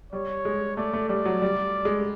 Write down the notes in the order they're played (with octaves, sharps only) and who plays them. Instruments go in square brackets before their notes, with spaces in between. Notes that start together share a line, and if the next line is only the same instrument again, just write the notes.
[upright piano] G3 [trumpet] C#5
[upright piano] G#3
[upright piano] A3 [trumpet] D5
[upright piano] A3
[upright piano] G3 [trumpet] D5
[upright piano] F#3
G3
G#3